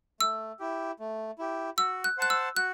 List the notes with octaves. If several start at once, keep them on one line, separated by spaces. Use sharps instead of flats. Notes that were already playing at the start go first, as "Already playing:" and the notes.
A3 E6
E4 G4
A3
E4 G4
F#4 E6
F#6
C5 F#5 A5 F#6
E6
F#4 F#6